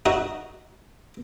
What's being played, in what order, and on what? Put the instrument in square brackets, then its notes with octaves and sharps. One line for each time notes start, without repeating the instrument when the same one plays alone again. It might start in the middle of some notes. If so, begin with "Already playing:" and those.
[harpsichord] D#4 F#4